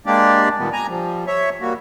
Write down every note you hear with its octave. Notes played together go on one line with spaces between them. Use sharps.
G#3 A#3 D4 G4 D5
A#2 D#3 G3 B3
G#5 A#5
F3 G3
C#5 E5
G3 A#3 F#4